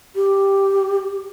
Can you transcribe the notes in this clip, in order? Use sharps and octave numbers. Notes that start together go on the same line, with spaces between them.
G4